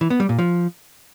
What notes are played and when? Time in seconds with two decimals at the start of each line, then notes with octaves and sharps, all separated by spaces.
0.01 E3
0.10 B3
0.20 G3
0.29 A#2
0.39 F3